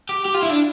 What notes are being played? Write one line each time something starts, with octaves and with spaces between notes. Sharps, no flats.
G4
G4
F4
E4
D4